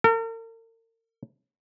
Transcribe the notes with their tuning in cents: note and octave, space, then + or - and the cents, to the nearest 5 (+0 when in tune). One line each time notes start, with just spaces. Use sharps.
A#4 -45